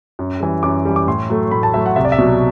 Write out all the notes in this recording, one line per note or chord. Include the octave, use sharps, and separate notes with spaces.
F#2
E3 G3
F#2 D6
E3 G3
D6
A2 C6
F#3 A3
A2 B5
A5
F#3 A3 E5
F#5
C2 E5
D5
E5
B2 F#3